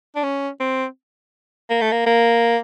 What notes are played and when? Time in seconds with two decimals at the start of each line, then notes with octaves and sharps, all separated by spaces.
0.16 D4
0.23 C#4
0.60 C4
1.70 A#3
1.81 A3
1.92 A#3
2.06 A#3